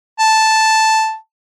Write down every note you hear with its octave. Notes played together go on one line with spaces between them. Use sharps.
A5